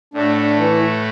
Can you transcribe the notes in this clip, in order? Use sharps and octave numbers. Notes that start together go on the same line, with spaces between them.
A2 A3 D4 F#4
D4
E3